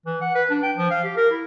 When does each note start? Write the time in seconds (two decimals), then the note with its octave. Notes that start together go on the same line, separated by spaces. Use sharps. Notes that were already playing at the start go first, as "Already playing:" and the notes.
0.06 E3
0.21 F#5
0.35 B4
0.50 D4
0.63 G5
0.76 F3
0.90 F5
1.04 G4
1.17 A#4
1.31 E4